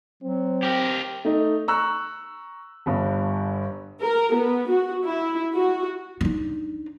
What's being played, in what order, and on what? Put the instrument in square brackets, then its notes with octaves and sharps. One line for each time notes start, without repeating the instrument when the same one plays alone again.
[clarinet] F#3 [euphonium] C4
[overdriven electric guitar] G4 A#4
[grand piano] A3 D#4
A#5 C#6 E6 F#6
G1 G2
[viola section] A#4
B3
F#4
E4
F#4
[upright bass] D4 D#4